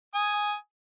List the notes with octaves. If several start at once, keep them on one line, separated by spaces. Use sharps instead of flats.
G#5 D#6